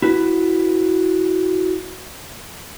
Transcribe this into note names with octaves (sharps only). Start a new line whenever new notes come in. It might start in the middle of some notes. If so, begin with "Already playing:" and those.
E4 F#4 B4